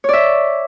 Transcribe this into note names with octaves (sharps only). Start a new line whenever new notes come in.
C#5 D5 E5